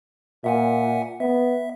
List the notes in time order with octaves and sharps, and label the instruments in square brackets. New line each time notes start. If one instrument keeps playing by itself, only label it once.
[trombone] A#2 [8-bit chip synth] E5 F#5 G#5
[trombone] B3 [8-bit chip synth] E5